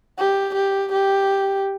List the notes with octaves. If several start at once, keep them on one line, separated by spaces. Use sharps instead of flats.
G4
G4
G4